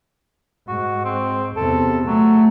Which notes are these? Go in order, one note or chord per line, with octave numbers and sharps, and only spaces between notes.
G#2 F#4
C4
E2 C3 A4
F#3 A3